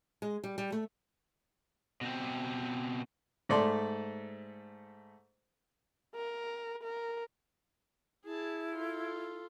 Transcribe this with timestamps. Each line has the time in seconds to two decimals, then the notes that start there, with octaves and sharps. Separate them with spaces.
0.22 G#3
0.44 G3
0.58 G3
0.72 A3
2.01 B2 C4
3.49 G#2 A3 A4 D5 C6
6.15 A#4
6.83 A#4
8.25 E4 G#4 A5
8.74 F4 A4